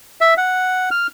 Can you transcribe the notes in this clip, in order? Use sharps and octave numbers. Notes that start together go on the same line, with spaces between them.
E5
F#5
F6